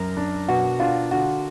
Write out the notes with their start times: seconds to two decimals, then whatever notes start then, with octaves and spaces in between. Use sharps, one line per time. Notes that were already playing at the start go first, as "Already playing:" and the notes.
Already playing: F#2 A#4
0.17 D4
0.48 B2 F#4
0.79 D4 F4
1.11 D3 F#4